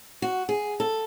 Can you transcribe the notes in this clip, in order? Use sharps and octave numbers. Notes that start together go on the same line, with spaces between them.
F#4
G#4
A4